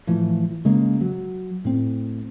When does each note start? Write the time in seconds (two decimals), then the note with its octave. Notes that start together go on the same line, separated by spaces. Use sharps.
0.07 A2 E3 F3
0.65 C#3 G#3 A#3
1.01 F#3
1.65 A2 C4